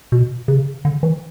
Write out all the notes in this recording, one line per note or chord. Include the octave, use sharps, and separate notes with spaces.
B2
C#3
D3
E3